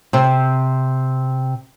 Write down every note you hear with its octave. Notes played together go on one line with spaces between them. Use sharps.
C3 C4